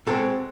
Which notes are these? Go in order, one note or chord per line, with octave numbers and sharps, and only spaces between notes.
B2 G#3 C4 A4